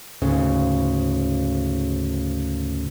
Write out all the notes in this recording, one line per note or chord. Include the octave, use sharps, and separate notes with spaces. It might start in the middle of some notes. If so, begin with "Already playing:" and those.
D2 G#2 C#3